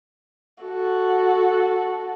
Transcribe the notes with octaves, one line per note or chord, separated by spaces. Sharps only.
F#4 A4